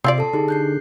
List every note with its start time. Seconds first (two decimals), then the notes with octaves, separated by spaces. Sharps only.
0.04 C3 C4 F4 D5 C7
0.18 A4 A5
0.33 D3 D#4 G4 G#4
0.48 F#6 G6 C7